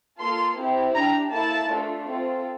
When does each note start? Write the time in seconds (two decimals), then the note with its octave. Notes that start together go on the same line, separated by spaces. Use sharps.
0.19 A#3 F4 A4 C6
0.57 C4 E4 G4
0.94 D4 G4 A#5
1.32 A#3 E4 A4 A5
1.69 A3 D4 F4 A4
2.07 C4 F4 A4